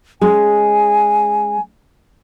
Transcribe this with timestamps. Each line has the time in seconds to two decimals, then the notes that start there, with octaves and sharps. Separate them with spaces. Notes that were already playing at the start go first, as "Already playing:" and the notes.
0.21 G#3 C#4 G#5